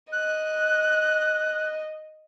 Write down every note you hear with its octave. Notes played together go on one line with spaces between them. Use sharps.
D#5 F#6